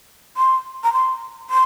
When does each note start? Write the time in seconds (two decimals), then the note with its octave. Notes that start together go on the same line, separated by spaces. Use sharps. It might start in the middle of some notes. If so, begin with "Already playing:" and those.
0.37 C6
0.84 A#5
0.93 C6
1.50 C6